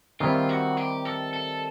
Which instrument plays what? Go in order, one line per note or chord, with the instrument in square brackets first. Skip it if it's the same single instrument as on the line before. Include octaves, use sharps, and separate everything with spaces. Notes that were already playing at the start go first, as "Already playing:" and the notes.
[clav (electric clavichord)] D#3 G3 C4 E4 [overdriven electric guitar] F4
[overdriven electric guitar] F#4
G4
A4
A4